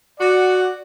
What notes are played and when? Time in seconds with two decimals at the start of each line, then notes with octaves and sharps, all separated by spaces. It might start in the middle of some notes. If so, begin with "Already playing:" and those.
0.20 F#4 D5 F#5